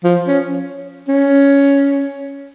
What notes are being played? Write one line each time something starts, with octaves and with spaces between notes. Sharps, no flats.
F3
C#4
C#4